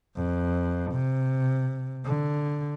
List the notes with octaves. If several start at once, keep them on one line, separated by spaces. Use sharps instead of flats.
F2
C3
D3